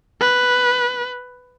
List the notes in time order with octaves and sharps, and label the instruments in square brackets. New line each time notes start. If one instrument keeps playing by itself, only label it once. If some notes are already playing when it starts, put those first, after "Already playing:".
[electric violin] B4